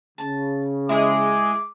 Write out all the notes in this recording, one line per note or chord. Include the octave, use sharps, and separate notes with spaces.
C#3 A5
G#3 E4 G#4 D6